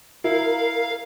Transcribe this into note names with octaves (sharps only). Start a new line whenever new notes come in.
E4 A#4 F5